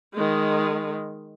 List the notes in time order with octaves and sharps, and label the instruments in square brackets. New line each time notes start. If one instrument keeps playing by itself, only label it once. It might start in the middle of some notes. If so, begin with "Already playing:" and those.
[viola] D#3 G#3